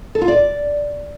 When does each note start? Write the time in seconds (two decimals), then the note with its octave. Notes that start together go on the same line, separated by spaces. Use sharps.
0.15 A4
0.22 F4
0.28 D5